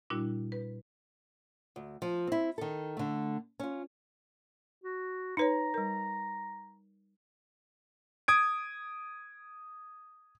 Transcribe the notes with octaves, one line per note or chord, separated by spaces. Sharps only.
A#2 G3 D4 E4 F#4
B4
D2
F3
C4 E4
D#3 A4
D3 A3
C#4 F4
F#4
D#4 B4 C#5 A#5
G3 A#4
D#6 G#6 D7